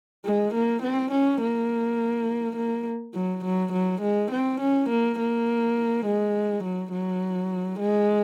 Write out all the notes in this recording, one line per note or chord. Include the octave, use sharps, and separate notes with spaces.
G#3
A#3
C4
C#4
A#3
A#3
F#3
F#3
F#3
G#3
C4
C#4
A#3
A#3
G#3
F#3
F#3
G#3